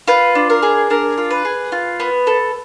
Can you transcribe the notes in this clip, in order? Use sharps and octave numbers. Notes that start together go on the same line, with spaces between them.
F4 B4
D4
A#4
G#4
D4 A#4
F4
B4
G#4
F4
B3
A4